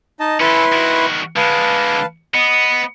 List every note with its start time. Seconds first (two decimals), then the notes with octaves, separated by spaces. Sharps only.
0.20 D#4 D#5 A5
0.40 C#4 E4 A4 B4 C6
0.73 D#3 F#4
1.37 D3 G#3 B4 F5 A5
2.34 B3 D#5